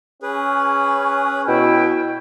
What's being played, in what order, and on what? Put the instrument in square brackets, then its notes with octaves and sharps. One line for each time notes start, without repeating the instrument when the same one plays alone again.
[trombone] C#4 [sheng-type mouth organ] G#4 B4
[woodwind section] B2 E4 G5